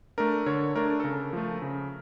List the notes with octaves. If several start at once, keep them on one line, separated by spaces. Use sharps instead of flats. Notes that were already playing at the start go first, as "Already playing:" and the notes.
A3 D4 A#4
D3 C#5
A3 D4 A#4
A4
C#3 A#4
F3 A3
C#3